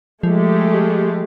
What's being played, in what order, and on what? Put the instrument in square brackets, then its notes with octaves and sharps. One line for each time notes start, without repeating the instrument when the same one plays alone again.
[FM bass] F3 [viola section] G#3 A3 G4